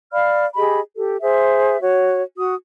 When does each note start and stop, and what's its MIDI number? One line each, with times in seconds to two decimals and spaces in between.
0.13 0.45 74
0.13 0.45 77
0.13 0.45 83
0.13 0.45 89
0.56 0.81 67
0.56 0.81 68
0.56 0.81 75
0.56 0.81 83
0.96 1.17 67
0.96 1.17 69
1.22 1.79 68
1.22 1.79 72
1.22 1.79 76
1.81 2.22 66
1.81 2.22 73
2.38 2.54 66
2.38 2.54 87